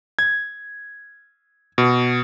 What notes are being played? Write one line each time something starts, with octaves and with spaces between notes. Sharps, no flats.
G#6
B2